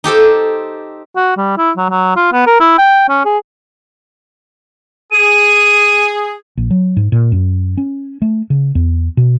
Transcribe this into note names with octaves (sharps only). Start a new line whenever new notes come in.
D#4 G4 A4 C5
F#4
G3
E4
F#3
F#3
F4
B3
A#4
E4
G5
C#4
G#4
G#4 D#7
A#1
F#3
G#2
A#2
F#2
C#4
A3
C#3
E2
B2